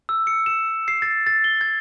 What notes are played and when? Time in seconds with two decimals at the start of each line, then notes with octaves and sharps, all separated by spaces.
0.09 E6
0.27 C#7
0.46 E7
0.88 C7
1.02 A6
1.27 A6
1.44 G7
1.61 G#6